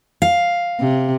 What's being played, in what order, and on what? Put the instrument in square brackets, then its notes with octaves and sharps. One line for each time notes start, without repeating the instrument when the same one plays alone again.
[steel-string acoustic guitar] F5
[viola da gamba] C3